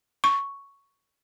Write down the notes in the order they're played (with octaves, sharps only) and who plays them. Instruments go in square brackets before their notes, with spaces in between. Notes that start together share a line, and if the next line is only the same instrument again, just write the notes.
[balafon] C#6